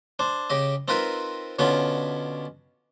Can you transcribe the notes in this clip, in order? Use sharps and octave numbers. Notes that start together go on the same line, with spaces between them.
D4 C5
C#3 G4 D#5
C4 D#4 F4 A#4 B4 E5
B2 D3 B3 C#4 F4